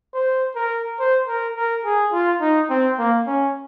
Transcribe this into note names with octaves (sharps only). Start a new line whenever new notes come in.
C5
A#4
C5
A#4
A#4
G#4
F4
D#4
C4
A#3
C#4